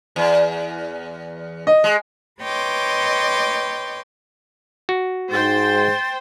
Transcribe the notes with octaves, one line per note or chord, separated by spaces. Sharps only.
E2
D#5
G#3
B4 C#5 D#5 G5 C6 D6
F#4
G#2 C5 G5 A6